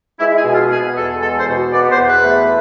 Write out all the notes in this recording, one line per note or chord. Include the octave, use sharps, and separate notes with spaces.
G#3 E4
G#4
B2
F4
B3 G#4
E2 A4
G#3 A4
C5
B2
B3 D5
C5
E2
B4
A3